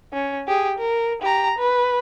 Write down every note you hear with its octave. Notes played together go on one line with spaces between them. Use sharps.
C#4
G4 G#4
A#4
G4 A#5
B4